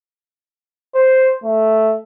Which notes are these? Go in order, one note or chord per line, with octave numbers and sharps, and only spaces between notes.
C5
A3